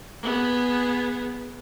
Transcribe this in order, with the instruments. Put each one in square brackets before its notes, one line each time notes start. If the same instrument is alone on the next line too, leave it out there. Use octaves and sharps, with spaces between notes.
[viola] B3 G#4